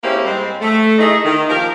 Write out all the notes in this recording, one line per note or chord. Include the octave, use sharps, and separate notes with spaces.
G#3 A#3 C4 C#4 E4 G4
G#2 G3 G#3 C4
A3
A3 D#4 E4 G#4 D#5
D#3
F3 A#3 G4 A#4